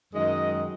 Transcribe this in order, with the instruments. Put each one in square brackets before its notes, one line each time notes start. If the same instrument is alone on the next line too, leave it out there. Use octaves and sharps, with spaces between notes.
[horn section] F#2 D#3 G#3 D#5